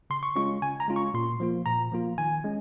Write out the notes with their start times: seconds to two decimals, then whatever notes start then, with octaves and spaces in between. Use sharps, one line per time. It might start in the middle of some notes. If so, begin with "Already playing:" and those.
0.10 C#3 C6
0.23 C#6
0.36 G#3 C#4 F4 C#6
0.62 C#3 G#5
0.80 A#5
0.88 G#3 C#4 F4
0.96 C#6
1.14 A#2 C6
1.40 F3 A#3 F4
1.66 A#2 A#5
1.92 F3 A#3 F4
2.18 D#3 G#5
2.44 G#3 C#4